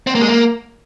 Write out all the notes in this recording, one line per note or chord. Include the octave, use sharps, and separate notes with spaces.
C4
A#3
G#3
A#3